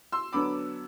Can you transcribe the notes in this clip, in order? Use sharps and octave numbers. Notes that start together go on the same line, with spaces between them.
C6 E6
D3 F#3 B3 D4 B5 D6